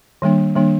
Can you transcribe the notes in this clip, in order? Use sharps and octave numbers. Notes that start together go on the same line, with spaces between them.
D#3 G3 A#3 D4
D#3 G3 A#3 D4